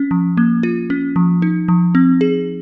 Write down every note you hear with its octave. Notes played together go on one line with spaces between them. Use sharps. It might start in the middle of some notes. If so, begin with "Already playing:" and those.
Already playing: C#4
F3
A#3
F4
C#4
F3
D#4
F3
C4
G#4